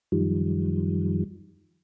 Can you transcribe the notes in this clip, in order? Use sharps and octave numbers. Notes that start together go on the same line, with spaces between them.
F#2 D#3 F3 G3